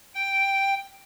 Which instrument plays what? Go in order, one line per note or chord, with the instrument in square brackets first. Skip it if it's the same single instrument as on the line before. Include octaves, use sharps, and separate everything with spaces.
[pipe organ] G5